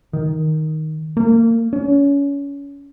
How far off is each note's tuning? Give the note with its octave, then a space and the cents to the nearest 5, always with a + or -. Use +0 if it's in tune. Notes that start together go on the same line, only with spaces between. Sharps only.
D#3 +5
A#3 -30
C#4 +25